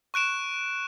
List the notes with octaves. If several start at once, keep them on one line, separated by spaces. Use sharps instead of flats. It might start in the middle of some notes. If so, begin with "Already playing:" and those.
C#6 F#6 D7 E7